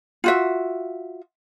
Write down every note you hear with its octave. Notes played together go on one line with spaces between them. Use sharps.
F4 F#4 E5